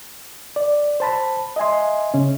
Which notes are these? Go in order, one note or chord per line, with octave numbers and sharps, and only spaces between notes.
D5
C5 A5 B5
D#5 E5 G#5 C6
C#3 C#4